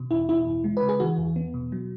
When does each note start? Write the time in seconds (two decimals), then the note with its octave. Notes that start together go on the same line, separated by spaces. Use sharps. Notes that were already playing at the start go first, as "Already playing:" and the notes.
Already playing: B2
0.11 E2 E4
0.29 B2 E4
0.47 E2
0.64 G#3
0.77 B4
0.83 C#3
0.89 G#4
1.00 E3 F#4
1.18 E2
1.36 B3
1.54 B2
1.72 F#3